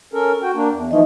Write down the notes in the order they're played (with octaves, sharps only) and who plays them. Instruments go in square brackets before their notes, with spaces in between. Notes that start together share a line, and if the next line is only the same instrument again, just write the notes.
[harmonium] C#4 A4 A#4
F#4 G5
A#3 D4
E2
[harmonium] E3 F3 A3 [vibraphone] D#4 D#5